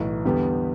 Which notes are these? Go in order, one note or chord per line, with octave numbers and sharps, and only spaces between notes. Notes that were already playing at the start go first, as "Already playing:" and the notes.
Already playing: B1 A2 E3
E2 D3 G3 B3